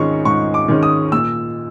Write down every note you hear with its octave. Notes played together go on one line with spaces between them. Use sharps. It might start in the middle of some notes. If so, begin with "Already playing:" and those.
Already playing: G#2 D#3 G#3 C#4 C#6
G#2 C#6
D6
D#3 G#3 C#4
D#6
A#2 E6